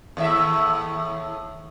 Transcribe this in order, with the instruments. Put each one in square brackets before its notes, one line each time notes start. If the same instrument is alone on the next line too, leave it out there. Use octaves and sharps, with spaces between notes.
[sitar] D#2 A2 E5